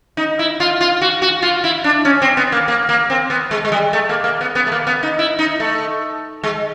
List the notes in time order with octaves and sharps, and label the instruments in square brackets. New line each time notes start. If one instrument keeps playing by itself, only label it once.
[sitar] D#4
E4
F4
F4
F#4
F#4
F4
E4
D4
C#4
C4
B3
A#3
A#3
A#3
C4
B3
G#3
G#3
G3
A3
A#3
A#3
B3
B3
A3
A#3
B3
D#4
E4
D#4
A3
G#3